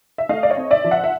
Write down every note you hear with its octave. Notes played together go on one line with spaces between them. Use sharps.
E5
A3 D#5 F5
D5
C#5 D#5
C4
D5 E5
F3
E5 F#5
E5